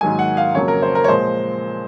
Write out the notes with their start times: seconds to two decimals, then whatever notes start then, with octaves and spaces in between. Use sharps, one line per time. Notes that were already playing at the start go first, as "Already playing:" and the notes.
0.01 G#2 D#3 F#3 A#3 G#5
0.19 F#5
0.37 F5
0.55 F2 C#3 F#3 A#3 C#5
0.68 A#4
0.82 C5
0.95 A#4
1.04 C#5
1.08 A#2 F3 G#3 C5